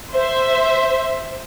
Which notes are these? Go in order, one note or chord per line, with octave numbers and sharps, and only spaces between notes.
C5 E5